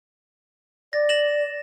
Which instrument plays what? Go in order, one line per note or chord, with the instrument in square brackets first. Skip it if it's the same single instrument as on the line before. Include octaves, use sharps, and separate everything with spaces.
[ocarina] D5 [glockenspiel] A6 A#6
[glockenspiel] A#6 E7 F#7